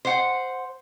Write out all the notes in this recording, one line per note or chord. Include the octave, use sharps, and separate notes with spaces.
C5 F#5